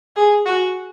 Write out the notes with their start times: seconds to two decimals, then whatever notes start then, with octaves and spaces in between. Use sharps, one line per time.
0.16 G#4
0.46 F#4